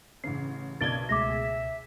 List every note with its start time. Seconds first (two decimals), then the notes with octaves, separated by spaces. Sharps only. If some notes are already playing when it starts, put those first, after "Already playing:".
0.24 A1 C#3 C7
0.81 B1 A#4 D5 D#5 G#6 A6 D7 G7
1.09 C#2 B2 G#3 A3 E5 D6 A#6
1.29 G#4